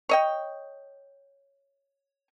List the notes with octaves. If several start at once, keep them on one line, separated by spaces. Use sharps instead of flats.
C#5 D#5 G5